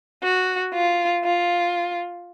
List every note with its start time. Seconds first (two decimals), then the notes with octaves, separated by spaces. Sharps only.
0.23 F#4
0.73 F4
1.24 F4